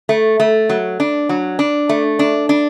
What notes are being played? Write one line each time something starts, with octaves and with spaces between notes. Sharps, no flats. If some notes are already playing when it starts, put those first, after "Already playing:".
A3
A3
F#3
D4
F#3
D4
A3
D4
D4